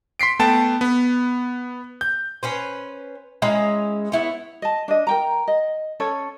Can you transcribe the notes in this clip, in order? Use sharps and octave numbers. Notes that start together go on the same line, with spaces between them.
C6 B6 C7 D7
A3 B3 G5 A5
B3
G6
C#4 B4 C5
G#3 C#4 E4 A#5
B3 E4 C#5
D#5 A5
D4 D#5
A#4 G5 A#5
D#5
C#4 A4 C#5